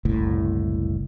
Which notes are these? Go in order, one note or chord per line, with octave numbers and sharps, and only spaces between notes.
F#1 C2 A2